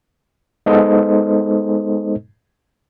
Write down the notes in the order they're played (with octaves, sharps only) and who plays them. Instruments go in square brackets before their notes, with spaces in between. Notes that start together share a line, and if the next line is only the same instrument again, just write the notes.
[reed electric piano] G#3 B3 D#4 A4 C5 D#5